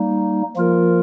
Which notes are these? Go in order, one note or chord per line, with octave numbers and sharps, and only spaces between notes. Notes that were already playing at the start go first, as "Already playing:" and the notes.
Already playing: G3 A#3 D#4
F3 A#3 F4 A#4